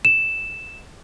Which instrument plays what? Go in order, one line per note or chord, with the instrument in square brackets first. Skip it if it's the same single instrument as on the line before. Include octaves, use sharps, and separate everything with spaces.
[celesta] E7